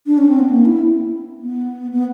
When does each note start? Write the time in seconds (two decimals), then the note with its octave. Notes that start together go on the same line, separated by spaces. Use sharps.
0.06 D4
0.18 C#4
0.29 C4
0.39 B3
0.50 A#3
0.65 E4
1.42 B3
1.91 B3